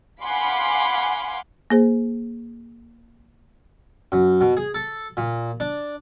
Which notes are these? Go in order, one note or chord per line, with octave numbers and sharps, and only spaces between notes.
F5 F#5 G#5 B5 C6 D6
A#3 G#4 C5
F#2
B2
G#4
A4
A#2
D4